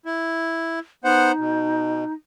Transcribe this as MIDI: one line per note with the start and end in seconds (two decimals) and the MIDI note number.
0.05 0.79 64
1.04 1.32 59
1.04 2.13 63
1.04 1.32 72
1.04 1.32 78
1.38 2.04 47